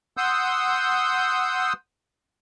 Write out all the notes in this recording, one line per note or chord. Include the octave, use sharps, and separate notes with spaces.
F#5 C6 D#6 E6 G6